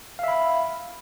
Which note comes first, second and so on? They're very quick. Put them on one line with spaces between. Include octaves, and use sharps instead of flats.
F5 E5 B5